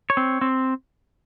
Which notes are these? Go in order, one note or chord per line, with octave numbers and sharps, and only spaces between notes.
C#5
C4
C4